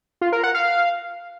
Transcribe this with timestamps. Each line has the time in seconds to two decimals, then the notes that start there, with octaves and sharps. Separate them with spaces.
0.21 F4
0.32 A#4
0.44 F#5
0.55 F5